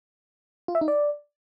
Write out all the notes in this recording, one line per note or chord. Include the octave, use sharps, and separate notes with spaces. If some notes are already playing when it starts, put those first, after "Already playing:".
F4
E5
D#4
D5